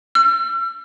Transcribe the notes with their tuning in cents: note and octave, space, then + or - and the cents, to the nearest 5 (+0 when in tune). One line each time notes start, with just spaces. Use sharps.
E6 +45